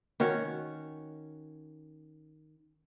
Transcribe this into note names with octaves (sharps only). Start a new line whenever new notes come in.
D#3 C#4 F#4 C#5